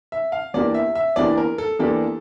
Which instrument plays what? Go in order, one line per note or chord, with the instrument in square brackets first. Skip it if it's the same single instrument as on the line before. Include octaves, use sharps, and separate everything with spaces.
[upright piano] E5
F5
[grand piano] E2 E3 A#3 D4 G4 [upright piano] D5
[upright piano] E5
E5
[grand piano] E2 E3 A#3 D4 G4 [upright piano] D5
[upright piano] A#4
A4
[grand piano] E2 E3 A#3 D4 G4 [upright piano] A4